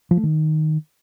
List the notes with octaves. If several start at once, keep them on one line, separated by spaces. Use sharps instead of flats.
F3
A3
D#3